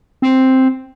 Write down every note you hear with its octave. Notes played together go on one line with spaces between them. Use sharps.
C4